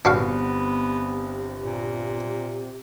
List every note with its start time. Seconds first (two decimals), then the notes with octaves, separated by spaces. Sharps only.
0.05 G1 C3 B3 D4 F#4 B4 F5
1.64 A#2